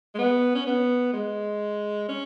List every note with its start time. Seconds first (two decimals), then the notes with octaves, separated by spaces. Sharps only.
0.15 G#3
0.18 B3
0.54 C#4
0.66 B3
1.13 G#3
2.08 C#4